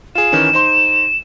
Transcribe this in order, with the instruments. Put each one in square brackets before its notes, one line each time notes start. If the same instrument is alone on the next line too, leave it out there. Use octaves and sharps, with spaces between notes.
[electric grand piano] F4 G#4 [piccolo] E7
[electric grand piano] D#3 E3 C#4
D#4 C5 C6